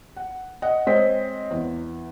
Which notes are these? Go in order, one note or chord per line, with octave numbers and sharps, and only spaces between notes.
F#5
D#5 F#5
G#3 C4 C5 C#5 D#5 B6
E2